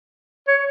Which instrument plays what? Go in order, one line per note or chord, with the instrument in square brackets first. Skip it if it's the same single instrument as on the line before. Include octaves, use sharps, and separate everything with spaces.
[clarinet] C#5